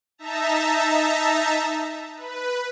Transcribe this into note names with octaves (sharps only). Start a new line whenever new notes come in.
D#4 E5 A5 A#5
B4